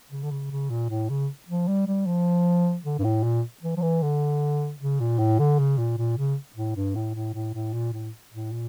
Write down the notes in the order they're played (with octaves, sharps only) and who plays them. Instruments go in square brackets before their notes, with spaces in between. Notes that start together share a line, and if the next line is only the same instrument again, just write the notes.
[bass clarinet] C#3
D3
C#3
C#3
A#2
A2
C#3
F3
G3
G3
F3
D3
G2
A2
A#2
E3
F3
E3
D3
C#3
A#2
A2
D3
C#3
A#2
A#2
C#3
A2
G2
A2
A2
A2
A2
A#2
A2
A2
A#2